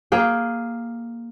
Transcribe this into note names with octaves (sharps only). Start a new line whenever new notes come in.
A#3 G#4 G5